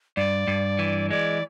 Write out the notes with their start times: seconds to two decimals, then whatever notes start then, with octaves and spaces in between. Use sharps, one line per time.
0.17 G2 D5
0.47 G2
0.79 E3
1.11 G#3 D5